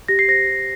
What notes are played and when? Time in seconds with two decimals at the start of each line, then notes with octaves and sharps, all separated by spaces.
0.08 G4 A#6
0.19 C7
0.28 C5 A#6
0.48 G4